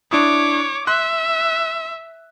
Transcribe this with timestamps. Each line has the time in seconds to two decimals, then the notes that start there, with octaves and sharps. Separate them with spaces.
0.11 D4 E4 C#5 D6 D#6
0.87 E5 C6 F#6